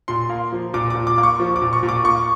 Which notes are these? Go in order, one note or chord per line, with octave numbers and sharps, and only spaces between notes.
A#2 C6
A#3
F3
A#2 D6
D6
A#2
D6
A#3 D6
C#6
F3
D6
A#2
C#6
A#2
D6
A#3 C#6